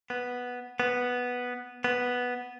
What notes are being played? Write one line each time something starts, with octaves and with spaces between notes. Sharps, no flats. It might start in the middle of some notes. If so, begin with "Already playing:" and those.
B3
B3
B3